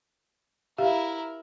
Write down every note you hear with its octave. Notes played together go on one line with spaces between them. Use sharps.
E4 G4 A#4 E5 F5